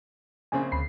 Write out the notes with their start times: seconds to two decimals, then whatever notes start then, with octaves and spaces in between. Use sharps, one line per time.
0.52 A#1 C#3 C4 G#5
0.72 D2 B5 C7